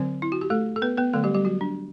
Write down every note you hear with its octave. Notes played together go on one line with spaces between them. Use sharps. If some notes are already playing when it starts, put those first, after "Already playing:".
Already playing: D3 F#3 C4 C5
E4
F#4
G4
A3 A4
A4
B3 B4
B3 B4
D3 F#3 A3 B3 A4
G3 G4
G3 G4
F#3 F#4
D4